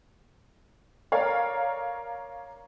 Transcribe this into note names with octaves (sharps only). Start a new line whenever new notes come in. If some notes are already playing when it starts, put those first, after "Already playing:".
A#4 C#5 D5 F5